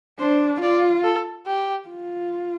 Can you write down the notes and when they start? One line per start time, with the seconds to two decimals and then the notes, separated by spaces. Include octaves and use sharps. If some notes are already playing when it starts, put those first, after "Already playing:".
0.19 D4 C5
0.61 F4 D5
1.04 A4
1.46 G4
1.88 F4